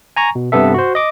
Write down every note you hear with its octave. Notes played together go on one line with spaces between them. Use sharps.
G#5 A#5 C#6
B2
G2 C3 B3 A4 E5
F#4 C5
D#5 D6